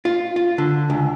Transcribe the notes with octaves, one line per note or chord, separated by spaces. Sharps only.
F4
F4
D3
C#2